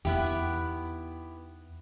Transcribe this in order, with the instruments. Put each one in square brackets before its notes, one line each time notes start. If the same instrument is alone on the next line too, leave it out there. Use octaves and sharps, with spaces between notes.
[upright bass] E2 D#4 [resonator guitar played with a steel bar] B3 E4 G4